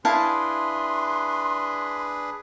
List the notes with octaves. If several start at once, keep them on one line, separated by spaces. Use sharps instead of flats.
D4 E4 G#4 B4 F5 A5 C6